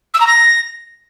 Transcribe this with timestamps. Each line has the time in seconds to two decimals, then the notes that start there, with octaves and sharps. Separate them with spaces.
0.14 E6
0.20 A#5
0.27 A#6